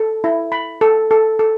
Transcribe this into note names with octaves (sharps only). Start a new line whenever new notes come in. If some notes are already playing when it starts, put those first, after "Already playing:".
Already playing: A4
E4
B5
A4
A4
A4